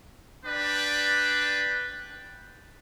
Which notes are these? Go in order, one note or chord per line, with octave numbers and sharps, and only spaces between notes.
D4 B4 D5 G5